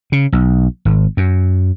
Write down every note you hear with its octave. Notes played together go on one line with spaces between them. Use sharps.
C#3
B1
G#1
F#2